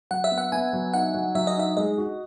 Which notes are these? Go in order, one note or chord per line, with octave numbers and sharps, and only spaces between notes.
F#3 F#5
E5
B3
F#5
B3 G#5
F#3
D#4 F#5
F#3
F#3 E5
D#5
D#4 E5
G#3 D#5
F#4